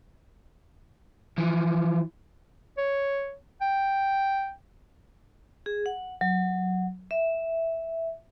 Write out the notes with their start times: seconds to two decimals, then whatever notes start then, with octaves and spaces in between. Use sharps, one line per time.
1.38 E3 F3
2.78 C#5
3.61 G5
5.66 G#4
5.86 F#5
6.21 F#3
7.11 E5